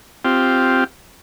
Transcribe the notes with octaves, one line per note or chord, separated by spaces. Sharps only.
C4 F4 G4